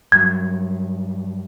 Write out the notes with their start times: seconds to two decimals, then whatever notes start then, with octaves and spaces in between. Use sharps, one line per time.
0.12 G2 F#3 G#6